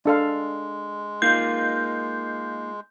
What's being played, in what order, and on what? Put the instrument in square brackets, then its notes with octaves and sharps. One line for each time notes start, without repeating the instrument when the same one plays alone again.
[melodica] G#3 [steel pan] D4 A4 F5
[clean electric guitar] A#3 D#4 F4 [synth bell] G6